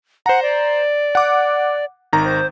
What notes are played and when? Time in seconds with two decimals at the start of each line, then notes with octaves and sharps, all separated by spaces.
0.26 C5 F#5 A#5
0.42 D5
1.15 F#5 D6
2.13 G#1 D#3 A#5
2.25 C5